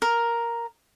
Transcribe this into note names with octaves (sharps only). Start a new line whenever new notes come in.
A#4